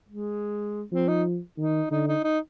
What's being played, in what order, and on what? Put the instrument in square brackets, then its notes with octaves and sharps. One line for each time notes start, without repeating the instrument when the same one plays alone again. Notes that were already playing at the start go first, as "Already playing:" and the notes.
[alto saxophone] G#3
[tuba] F3 [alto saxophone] C4
[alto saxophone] D#4
[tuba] D#3 [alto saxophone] D#4
[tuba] D3 [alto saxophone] D#4
[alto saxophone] D#4
D#4